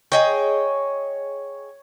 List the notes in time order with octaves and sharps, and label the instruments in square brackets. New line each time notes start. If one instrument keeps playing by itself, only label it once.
[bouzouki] G#4 D#5 G5 [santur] C#5